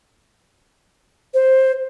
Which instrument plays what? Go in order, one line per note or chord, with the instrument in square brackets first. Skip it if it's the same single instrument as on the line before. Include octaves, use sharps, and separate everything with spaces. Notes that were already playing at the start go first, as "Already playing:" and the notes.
[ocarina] C5